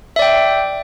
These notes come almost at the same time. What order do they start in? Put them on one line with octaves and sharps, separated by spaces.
E5 D5 G5